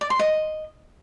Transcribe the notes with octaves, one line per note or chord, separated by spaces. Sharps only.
D5
C6
D#5